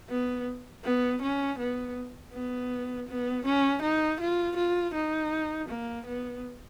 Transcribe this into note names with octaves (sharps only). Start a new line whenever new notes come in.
B3
B3
C#4
B3
B3
B3
C#4
D#4
F4
F4
D#4
A#3
B3